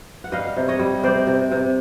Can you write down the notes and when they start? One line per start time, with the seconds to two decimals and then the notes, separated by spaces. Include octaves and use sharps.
0.24 F#5
0.32 G3 D#5 F5
0.56 C3
0.68 C#5 D#5
0.79 G3
1.03 C3 C5 D5
1.27 C3
1.51 C3